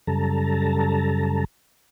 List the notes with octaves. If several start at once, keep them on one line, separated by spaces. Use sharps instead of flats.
F#2 C#3 G3 A4 A5 A#5